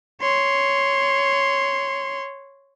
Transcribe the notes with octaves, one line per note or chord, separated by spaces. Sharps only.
C#5 C6